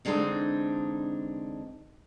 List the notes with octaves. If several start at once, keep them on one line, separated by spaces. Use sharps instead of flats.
D3 E3 G#3 C4 D4 D#4